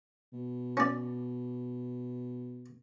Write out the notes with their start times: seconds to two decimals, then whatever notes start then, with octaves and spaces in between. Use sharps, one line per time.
0.33 B2
0.77 C#4 D5